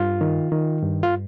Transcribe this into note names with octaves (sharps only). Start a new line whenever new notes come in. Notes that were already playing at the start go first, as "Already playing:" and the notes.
Already playing: G2 F4
D#3
D#3
G2
F4